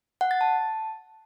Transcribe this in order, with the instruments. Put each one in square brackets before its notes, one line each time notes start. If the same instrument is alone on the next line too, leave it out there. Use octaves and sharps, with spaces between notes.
[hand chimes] F#5
A6
A5